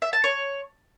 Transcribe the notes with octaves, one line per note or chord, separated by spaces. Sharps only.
E5
A5
C#5